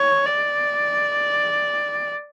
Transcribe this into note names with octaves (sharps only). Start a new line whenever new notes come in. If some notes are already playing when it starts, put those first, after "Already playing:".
Already playing: C#5
D5